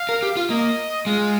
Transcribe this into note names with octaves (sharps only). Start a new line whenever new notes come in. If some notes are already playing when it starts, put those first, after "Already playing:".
Already playing: F5
A#4
G4
F4
A#3 D#5
G#3 F4